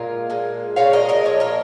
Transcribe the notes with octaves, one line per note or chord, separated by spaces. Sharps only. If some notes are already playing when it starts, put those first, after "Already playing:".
Already playing: A#2 G#3 F4 A#4
A#2 G#3
A#2 G#3 C#5 F5
A#4 D#5
A#4 D#5
A#2 F3 C#5
F4 A#4